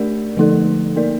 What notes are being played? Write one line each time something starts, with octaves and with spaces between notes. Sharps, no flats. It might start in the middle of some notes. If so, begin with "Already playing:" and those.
Already playing: A3 D4 G4 A#4 D5
D3 F3 A3 D#4 A4
A#3 D#4 A#4 D5